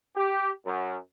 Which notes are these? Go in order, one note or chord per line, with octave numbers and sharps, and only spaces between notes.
G4
F#2